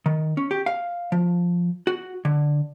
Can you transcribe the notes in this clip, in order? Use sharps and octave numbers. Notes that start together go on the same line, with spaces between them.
D#3
C#4
G4
F5
F3
F#4
D3